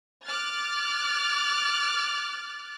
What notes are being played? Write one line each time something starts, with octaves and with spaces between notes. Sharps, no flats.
D6 F6 F#6 A6